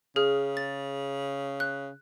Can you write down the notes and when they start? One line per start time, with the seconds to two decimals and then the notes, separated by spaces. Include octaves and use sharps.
0.16 C#3 G#4 F6
0.57 A6
1.60 F#6